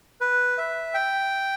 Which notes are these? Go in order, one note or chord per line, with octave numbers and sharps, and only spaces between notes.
B4
E5
G5